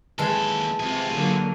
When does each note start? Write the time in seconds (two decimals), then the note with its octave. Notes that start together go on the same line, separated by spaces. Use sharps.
0.19 D#2 E3 G#3 A4 A5
0.80 C3 F4 G#4
1.12 D3 F#3 A#3 D#7